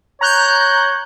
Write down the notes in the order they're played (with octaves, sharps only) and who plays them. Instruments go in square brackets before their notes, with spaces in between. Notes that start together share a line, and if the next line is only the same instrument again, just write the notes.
[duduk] C#5 [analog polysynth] A#5 F#6 G6